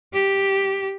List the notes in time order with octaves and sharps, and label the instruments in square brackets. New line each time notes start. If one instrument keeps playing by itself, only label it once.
[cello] G4